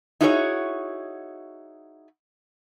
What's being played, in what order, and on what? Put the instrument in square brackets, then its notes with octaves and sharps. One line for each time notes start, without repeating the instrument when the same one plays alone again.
[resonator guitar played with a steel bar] D#4 E4 F#4 G#4 A#4 C#5